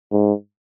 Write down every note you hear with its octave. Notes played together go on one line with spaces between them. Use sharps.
G#2